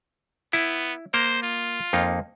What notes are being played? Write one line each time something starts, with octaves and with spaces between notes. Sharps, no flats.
B3 E4
A#3 A#4 C5
F4
F2 A#3 D#4